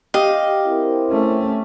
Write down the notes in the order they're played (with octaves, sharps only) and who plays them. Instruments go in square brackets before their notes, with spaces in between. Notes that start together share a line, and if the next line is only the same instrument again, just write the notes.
[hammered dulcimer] G4 [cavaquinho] D#5 F5
[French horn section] C4 E4 A#4
[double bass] A3 C#4